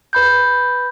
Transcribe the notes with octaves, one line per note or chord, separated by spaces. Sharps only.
B4 B5 G6